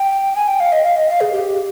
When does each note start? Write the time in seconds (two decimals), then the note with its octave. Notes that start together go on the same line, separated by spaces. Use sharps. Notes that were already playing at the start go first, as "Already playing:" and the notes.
Already playing: G5
0.36 G#5
0.48 G5
0.60 F5
0.72 D#5
0.84 F5
0.96 D#5
1.09 F5
1.21 G#4
1.33 G4